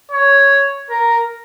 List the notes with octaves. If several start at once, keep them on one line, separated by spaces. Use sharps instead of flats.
C#5
A#4